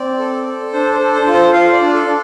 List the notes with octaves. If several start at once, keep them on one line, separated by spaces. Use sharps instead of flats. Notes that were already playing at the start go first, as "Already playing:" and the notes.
Already playing: C4 D5
A4
A4
D4 C5
C5
A4
C5
F4
C5
F4 F5
D5
D4
A4
D4